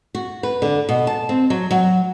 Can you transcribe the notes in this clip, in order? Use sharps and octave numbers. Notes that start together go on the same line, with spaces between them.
F#4
B4
D3
B2
A5
C4
F#3
F#3